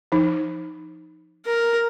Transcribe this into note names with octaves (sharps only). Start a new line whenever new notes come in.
F3 D#4
A#4